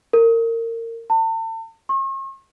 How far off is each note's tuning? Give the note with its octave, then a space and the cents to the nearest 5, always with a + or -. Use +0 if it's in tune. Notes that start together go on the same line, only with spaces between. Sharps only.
A#4 -25
A5 +40
C#6 -45